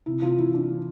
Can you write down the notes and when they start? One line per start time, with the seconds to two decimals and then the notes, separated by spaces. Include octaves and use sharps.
0.06 C3 E4
0.22 C3 F4
0.37 E3 E4
0.53 E3 D4